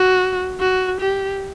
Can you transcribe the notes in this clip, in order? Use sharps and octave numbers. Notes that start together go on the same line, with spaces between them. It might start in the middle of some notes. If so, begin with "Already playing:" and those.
Already playing: F#4
F#4
G4